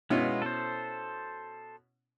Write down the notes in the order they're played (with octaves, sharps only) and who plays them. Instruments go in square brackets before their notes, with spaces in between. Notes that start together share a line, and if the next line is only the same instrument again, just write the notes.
[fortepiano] B2 C#4 E4 [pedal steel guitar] G#3 B3 F4
[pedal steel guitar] A4 C5